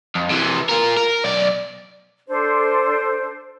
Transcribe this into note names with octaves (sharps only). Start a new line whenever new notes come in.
F2
C3 E3
F4 A#4
A#4
B1 D5
D4 A4 C5